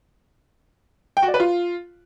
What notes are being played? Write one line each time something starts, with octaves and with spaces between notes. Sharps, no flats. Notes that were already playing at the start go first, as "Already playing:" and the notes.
G5
F#4
D5
B4
F4